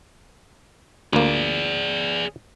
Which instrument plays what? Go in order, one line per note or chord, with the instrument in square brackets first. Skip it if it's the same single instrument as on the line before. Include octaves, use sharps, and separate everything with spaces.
[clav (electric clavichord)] D2 A#3 [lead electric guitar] G#4 D5